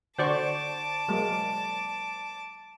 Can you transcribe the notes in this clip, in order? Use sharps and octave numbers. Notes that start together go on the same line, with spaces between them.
D3 F#4 C5 D5 A5 C#6 D6
F#3 G#3 A#3